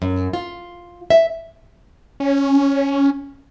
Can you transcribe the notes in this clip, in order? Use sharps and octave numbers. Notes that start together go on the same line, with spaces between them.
F#2
F4
E5
C#4